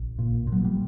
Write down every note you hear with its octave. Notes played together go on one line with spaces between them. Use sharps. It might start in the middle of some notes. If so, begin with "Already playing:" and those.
Already playing: A#1
A#2
A#2
F#3
G3